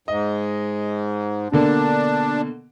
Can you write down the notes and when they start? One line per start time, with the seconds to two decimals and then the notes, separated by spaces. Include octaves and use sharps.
0.08 G#2 D#5
1.52 B2 D3 A#3 D4